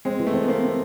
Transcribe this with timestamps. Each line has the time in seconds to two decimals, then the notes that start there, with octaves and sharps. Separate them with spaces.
0.05 G#3 C4
0.19 E3
0.26 A3
0.34 C4
0.41 B3
0.48 A#3 C4
0.63 C4